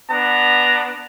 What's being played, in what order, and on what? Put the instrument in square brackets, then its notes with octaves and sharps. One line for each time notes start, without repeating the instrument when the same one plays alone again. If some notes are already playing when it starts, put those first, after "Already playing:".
[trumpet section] B3 D4 A#5